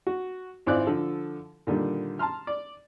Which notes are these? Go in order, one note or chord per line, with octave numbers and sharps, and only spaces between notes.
F#4
G#1 C4 E4 F4 D5 F#6
D3 F3 A4
A#2 D3 D#3 G3
A5 A#5 C6 F6
D5